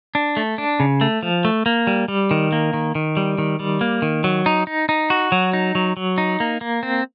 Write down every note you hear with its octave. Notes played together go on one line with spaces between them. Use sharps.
D4
A3
D4
C#3
A3
F3
A3
A#3
G3
G3
D#3
A#3
D#3
D#3
G3
D#3
G3
A#3
D#3
F#3
D#4
D#4
D#4
F#4
F#3
D#4
F#3
F#3
D#4
A#3
A#3
C4